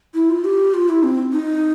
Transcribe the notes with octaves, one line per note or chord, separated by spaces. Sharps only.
E4
F4
G4
F4
E4
C4
D#4